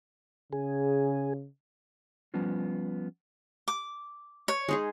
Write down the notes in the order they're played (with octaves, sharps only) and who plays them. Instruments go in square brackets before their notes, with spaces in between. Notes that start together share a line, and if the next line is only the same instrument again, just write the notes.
[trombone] C#3 [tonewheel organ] G#4
[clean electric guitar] F3 G3 B3 C#4 F4
[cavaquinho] D6
C#5
[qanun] G#3 D#4 G#4